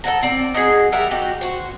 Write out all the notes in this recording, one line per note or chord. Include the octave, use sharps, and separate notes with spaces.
A4 C#5 F#5 A#5
C4 D5
D#4 F#4 G#4
G3 A#4 E5 F#5
D#4 F#4 G4
F#4 C5